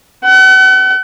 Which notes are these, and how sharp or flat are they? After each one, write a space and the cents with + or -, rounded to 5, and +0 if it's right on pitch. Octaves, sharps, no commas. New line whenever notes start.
F#5 +40